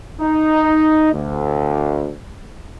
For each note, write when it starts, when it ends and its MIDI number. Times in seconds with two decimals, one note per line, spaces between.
0.21 1.11 63
1.13 2.12 38